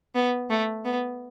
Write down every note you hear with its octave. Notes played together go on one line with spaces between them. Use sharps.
B3
A3
B3